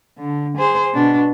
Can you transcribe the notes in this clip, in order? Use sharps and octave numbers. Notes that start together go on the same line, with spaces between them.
D3
G#4 C5
B2 D4